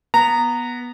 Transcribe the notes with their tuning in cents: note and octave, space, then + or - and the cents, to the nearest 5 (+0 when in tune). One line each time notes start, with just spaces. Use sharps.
B3 -10 A#5 -15